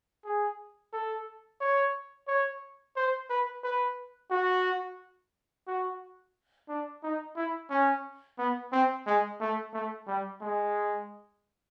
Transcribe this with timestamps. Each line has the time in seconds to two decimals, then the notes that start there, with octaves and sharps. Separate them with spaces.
0.25 G#4
0.93 A4
1.60 C#5
2.27 C#5
2.96 C5
3.30 B4
3.63 B4
4.31 F#4
5.67 F#4
6.68 D4
7.03 D#4
7.36 E4
7.70 C#4
8.38 B3
8.72 C4
9.06 G#3
9.40 A3
9.73 A3
10.07 G3
10.41 G#3